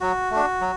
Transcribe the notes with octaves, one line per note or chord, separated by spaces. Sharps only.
F#3 F#4
A3 D4
F#3